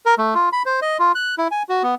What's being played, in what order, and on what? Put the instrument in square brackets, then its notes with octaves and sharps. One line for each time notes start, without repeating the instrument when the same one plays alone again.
[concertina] A#4
A3
F4
B5
C5
D#5
F4
F#6
E4
G#5
F#4
B3